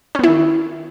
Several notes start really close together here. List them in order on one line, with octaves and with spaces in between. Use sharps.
C#4 B3 E4 D#3